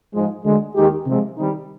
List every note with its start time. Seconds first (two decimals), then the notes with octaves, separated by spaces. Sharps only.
0.14 G#2 F3 G#3
0.44 D2 D3 G#3
0.76 D#2 D#3 G#3 D#4 G4
1.06 C3 F3 G#3
1.37 D#3 G3 C4 D#4